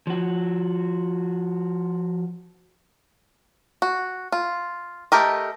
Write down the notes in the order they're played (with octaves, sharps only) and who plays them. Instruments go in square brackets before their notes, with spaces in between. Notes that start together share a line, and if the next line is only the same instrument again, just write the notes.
[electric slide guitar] F3 F#4
[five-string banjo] F#4
F4
A3 G4 A#4 D#5